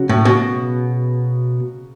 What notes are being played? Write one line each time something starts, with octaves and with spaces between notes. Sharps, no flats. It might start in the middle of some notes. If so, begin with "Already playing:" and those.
Already playing: C#3 F#3 C#4 F#4
A2
B2